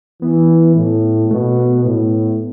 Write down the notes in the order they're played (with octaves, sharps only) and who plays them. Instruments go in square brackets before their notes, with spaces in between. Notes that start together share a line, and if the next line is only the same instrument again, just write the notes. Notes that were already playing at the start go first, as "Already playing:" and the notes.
[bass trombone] E3 [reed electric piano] B3
[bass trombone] A2
[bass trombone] B2 [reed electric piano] A3
[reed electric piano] B3
[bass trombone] A2